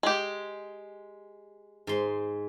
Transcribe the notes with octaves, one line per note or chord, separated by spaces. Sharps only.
G#3 G4
G#2 C6